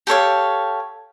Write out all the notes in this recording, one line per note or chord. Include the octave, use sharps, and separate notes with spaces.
G4 A4 C#5 F5